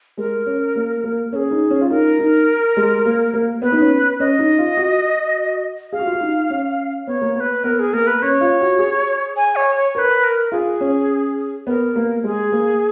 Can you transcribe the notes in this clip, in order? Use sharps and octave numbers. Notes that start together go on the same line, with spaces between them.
G#3 A#4
C#4
A#3
A#3
C#4 G#4 A#4
D#4
C#4
F4
D#4 A#4
D#4
G#3
A#3
A#3
B3 B4
D#4
C#4
C#4 D#5
D#4
F4
F#4
G#4 F5
F#4
F4
F#4
D#4
C#4
B3 C#5
A#3
B3 C#5
B4
B3 A#4
G#4
A#3 A#4
B4
C#4 C#5
F4
F#4
G#4
G#5
C#5
C#5
A#4 B4 C#5
A#4
F4 G#4
C#4
B3 A#4
A#3
G#3 G#4
A#3